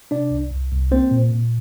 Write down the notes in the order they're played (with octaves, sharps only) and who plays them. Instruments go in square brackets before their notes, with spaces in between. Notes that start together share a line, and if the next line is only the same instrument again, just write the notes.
[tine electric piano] C3 D4 D5
C2
C2
C2
A#3 C4 C5
A#2
A#2